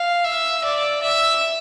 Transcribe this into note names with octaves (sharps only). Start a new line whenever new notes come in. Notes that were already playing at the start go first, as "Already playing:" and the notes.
Already playing: F5
E5
D5
E5